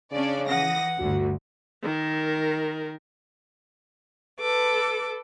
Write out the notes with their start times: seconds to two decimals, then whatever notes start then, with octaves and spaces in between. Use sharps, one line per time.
0.12 C#3 C#4 D4 D5
0.48 E3 F#5 D#6 A#6
0.99 G1 D2 D3 F#4
1.83 D#3 A#4
4.39 A4 B4 D6